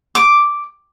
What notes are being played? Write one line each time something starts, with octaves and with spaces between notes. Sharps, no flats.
D6